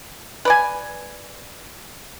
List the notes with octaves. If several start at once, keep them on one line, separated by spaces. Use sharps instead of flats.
B4 D5 G#5